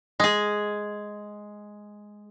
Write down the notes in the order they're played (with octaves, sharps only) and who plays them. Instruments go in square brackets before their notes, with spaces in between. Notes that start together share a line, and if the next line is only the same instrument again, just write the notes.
[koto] G#3 G#4